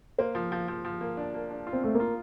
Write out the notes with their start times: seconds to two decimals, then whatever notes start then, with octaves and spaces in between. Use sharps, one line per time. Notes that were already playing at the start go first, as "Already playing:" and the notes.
0.18 A#3 C5
0.35 F3
0.52 F3
0.68 F3
0.85 F3
1.01 A#3
1.17 D4
1.34 A#3
1.50 D4
1.67 F4
1.73 C4
1.84 A3 F4
1.95 A#3
2.00 F4